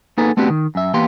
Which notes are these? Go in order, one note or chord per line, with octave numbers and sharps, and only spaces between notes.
A#3 B3 D#4 G#4 A4 B4
A3 B3 C4 D4 F#4 G4
D#3
F#2 E5
E2 A#3 B3 G4 F5 C6